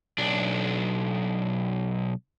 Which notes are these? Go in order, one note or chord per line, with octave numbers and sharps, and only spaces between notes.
B1 D4